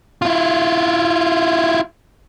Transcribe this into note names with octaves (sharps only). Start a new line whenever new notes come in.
E4 F4